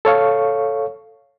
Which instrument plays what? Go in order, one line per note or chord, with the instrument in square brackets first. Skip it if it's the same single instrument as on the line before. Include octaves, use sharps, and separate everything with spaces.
[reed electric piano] A4 C#5 F5 C#6